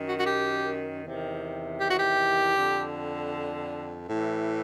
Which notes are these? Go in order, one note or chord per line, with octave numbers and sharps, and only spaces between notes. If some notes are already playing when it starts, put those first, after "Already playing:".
Already playing: F#2 D#3
F#4
F#4
G4
E2 C3 D#3
G4
F#4
G4
F2 D3
A2 E3